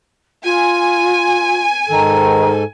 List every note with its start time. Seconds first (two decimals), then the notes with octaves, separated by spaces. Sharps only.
0.44 F4 G#5
1.89 G#2 D#3 A4